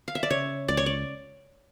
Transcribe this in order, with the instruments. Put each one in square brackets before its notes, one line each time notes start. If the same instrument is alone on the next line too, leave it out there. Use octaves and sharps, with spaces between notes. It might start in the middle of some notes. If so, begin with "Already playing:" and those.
[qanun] F5
E5
D5
[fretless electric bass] C#3 [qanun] C#5
[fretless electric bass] C#2 [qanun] D5
[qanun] C#5
D5